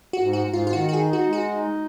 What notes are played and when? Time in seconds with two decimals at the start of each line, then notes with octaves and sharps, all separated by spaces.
0.13 F#4
0.21 G#2
0.33 F#4
0.47 G#2
0.53 F4
0.67 F4
0.73 D#3 F#4
0.89 F#4
0.93 G#4
1.00 D#4
1.13 F#4
1.26 G#3
1.33 F#4
1.52 D#4